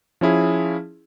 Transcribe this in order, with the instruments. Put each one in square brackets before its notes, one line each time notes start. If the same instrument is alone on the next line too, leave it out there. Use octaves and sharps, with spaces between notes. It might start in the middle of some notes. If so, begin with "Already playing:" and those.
[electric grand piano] F3 C#4 E4 G#4